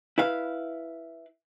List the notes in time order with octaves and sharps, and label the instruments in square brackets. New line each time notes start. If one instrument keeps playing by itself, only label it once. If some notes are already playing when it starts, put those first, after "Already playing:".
[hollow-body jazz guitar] E4 B4 F5